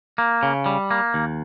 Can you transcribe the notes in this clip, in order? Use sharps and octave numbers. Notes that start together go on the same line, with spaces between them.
A#3
C#3
G3
A#3
D#2